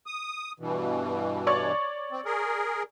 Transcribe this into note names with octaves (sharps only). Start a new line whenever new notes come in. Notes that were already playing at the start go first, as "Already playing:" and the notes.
D#6
G2 B2 E3
C#5 D5 C#6
C4
G#4 A#4